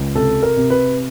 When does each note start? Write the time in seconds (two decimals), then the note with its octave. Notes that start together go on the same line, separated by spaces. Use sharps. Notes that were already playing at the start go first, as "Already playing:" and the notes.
Already playing: C#2
0.15 C3 A4
0.42 A#4
0.57 C3
0.70 B4